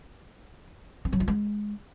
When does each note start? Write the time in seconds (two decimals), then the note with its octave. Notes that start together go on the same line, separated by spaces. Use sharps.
1.05 C4
1.13 F#3
1.20 F4
1.28 G#3